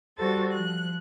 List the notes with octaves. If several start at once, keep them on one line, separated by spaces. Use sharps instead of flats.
G3 F#4 A4 C5 A6
F3 F#6